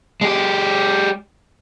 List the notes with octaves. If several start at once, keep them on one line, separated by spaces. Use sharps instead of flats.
G#3 G4